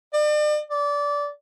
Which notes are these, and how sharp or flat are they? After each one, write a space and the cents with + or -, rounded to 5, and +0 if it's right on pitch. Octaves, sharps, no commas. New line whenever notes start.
D5 +40
D5 -20